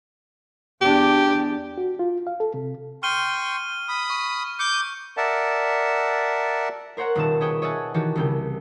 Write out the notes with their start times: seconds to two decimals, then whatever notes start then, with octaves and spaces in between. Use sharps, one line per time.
0.81 E2 D4 G4
1.78 F#4
1.99 F4
2.27 F5
2.40 A4
2.54 C3
3.03 G5 C6 C#6 F6 D#7 G7
3.89 B5 D#6
4.10 C#6
4.59 D6 G6 C#7
5.17 A#4 D5 E5 F#5 A5
6.97 A#4 C5 C#5 F#5 A#5
7.15 D#1 B2 D#3 E5 A5 E7
7.41 G#4 B4 C#5 D#5 G5
7.62 C#5 D#5 E5 F#5 G#5 A5
7.94 D#3 E3 F#4 G4 C#5 A5
8.15 C2 C#3 G5